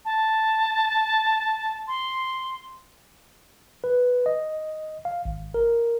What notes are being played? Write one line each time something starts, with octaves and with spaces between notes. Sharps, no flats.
A5
C6
B4
D#5
F5
G#1
A#4